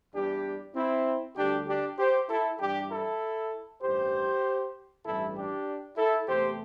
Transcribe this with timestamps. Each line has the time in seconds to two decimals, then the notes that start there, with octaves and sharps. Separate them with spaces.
0.14 E2 E3 G3 D4 G4
0.75 C4 E4
1.36 D2 D3 G3 D4 G4
1.67 D4 G4
1.98 G4 C5
2.29 E4 A4
2.60 G2 E3 G3 D4 G4
2.90 E4 A4
3.82 A1 G2 E3 G3 G4 C5
5.05 A1 G2 E3 G3 E4 A4
5.36 D4 G4
5.97 E4 A4
6.28 E2 C3 A3 G4 C5